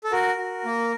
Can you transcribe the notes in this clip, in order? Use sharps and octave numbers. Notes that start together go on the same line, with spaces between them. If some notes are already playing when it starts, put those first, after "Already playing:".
A4
F#4 A#4
F#4
A#3